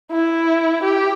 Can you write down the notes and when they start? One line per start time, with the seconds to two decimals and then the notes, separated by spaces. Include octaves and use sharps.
0.11 E4
0.84 G4